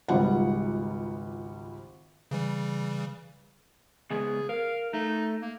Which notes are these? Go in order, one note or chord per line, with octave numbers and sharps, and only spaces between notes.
G#1 C#2 G3 F4 F#5
C#3 E3 G3
C#3 G#3 B3 G#4
A#4 F5
A3 D#4
A#3